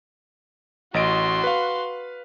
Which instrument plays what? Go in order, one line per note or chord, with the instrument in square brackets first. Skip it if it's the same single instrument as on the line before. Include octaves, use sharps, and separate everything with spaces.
[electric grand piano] A1 D#5 D7 [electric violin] F#4 C6
[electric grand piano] B4 F5